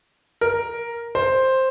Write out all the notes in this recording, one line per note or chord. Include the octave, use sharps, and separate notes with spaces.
A#4
C5